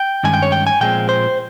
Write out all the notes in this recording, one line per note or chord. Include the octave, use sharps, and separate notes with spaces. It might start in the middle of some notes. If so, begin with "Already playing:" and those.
Already playing: G5
G2 D#3 G#3 C#4 G#5
G5
C#5
G5
G#5
A#2 F3 G#3 C4 G5
C5